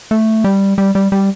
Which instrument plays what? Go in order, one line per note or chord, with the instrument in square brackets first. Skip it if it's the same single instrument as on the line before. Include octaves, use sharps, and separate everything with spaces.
[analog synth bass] A3
G3
G3
G3
G3